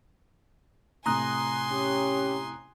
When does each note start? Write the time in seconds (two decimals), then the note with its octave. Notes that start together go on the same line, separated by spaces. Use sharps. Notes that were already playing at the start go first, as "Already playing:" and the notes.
1.06 A2 C3 G#5 A#5 C6 D#6 F#6
1.71 C#4 G4